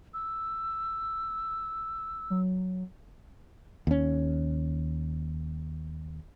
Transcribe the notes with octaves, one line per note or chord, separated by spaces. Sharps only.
E6
F#3
D#2 C#4